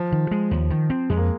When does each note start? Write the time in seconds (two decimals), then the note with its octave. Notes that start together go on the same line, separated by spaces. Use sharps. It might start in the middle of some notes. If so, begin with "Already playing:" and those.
Already playing: F3
0.12 D#3
0.31 G#3
0.51 D#2
0.70 D#3
0.90 C4
1.10 F2 G#3
1.17 A#3